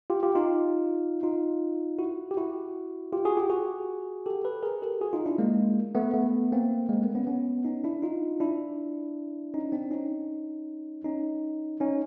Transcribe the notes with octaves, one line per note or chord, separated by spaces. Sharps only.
F4 G4
F4 G4
D#4 F4
D#4 F4
E4 F#4
G4
E4 F#4
F4 G4
F#4 G#4
F4 G4
F#4 G#4
G4 A4
A4 B4
G#4 A#4
G4 A4
F#4 G#4
D#4 F4
D4 E4
G#3 A#3
A3 B3
A3 B3
A#3 C4
G#3 A#3
A3 B3
B3 C#4
B3 C#4
C#4 D#4
D4 E4
D#4 F4
D4 E4
C#4 D#4
C4 D4
C#4 D#4
C#4 D#4
C#4 D#4